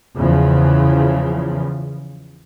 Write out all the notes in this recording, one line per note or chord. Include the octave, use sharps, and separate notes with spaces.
E2 C#3 F3